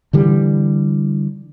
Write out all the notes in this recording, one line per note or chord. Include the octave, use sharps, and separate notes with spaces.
D3 E3 G3